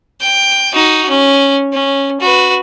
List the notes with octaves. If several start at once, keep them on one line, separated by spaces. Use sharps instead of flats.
G5
D#4 F#4
C#4
C#4
F#4 B4